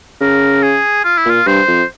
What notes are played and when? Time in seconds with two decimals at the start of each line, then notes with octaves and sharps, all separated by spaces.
0.21 C#3 A#4
0.63 G#4
1.04 F4
1.18 E4
1.26 A#2 F4
1.46 G2 C5
1.68 F2